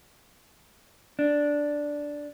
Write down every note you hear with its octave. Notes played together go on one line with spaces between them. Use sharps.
D4